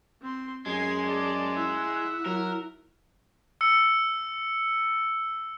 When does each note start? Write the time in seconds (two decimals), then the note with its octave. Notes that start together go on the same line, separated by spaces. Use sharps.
0.22 C4 C6
0.66 F#2 G#3 G#4 G#5 C7
1.05 D5 A5
1.56 E4 E5 F#5
2.26 F#3 A#4
3.61 E6 C#7